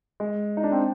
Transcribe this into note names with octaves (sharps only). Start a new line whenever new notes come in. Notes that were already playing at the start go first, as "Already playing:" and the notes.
G#3
D#4
D4
C4